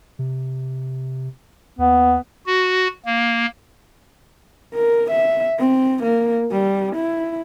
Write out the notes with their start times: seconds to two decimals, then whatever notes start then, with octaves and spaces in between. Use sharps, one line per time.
0.19 C3
1.78 D#2 B3
2.46 F#4
3.06 A#3
4.74 A#4
5.11 E5
5.59 C4
6.03 A#3
6.52 G3
6.95 E4